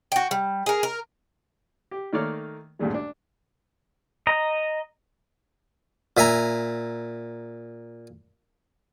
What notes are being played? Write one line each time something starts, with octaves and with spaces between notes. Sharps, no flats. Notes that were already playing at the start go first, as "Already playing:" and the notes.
F#4 G5
G3
G#4 A#4
A#4
G4
D#3 A3 A#3 C#5 D5 F6
A1 D2 G2 A#2 G#3
D4
D#5 A#5
A#2 E5 G#5 A#5